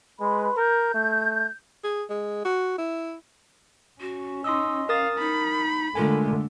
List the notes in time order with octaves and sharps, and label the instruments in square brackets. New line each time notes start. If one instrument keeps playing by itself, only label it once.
[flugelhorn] G#3 [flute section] B4 B5 C6
[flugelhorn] A#4 [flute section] G6
[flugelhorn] A3
[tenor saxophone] G#4
G#3
F#4
E4
[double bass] C#4 [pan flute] F#4
[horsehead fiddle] D#4 [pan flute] D#5 [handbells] C6 D#6 E6
[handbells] A#4 D#6 A6 [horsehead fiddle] F5
[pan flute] D#4 [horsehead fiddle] B5
[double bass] D3 A3 [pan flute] G#3 [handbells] F4 A#4 G#5